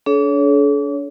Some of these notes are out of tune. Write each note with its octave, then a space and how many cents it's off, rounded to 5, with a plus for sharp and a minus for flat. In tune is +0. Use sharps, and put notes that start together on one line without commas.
D4 -35 A4 -40 C#5 +15